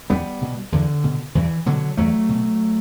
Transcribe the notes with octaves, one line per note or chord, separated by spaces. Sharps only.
E2 G3 B3
B2
E2 D3
B2
E2 E3
B2 D3 F#3
E2 F#3 A3
B2